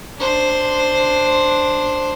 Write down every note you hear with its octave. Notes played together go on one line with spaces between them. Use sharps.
D4 C5